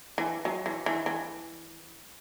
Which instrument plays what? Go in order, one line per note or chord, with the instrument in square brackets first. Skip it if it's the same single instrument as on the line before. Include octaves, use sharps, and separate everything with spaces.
[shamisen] E3
F#3
E3
E3
E3